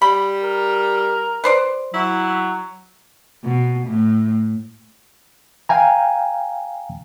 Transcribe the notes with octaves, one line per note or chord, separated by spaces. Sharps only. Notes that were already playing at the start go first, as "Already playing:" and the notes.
G3 B5
A#4
B4 C5 D5
F#3 E4
B2
A2
F5 G5 G#5 A#5